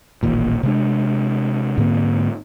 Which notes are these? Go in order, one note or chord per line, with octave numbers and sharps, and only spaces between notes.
D#1 A1 D#2 A#2
C3 G#3 D4
G#2 D3 A#3 C4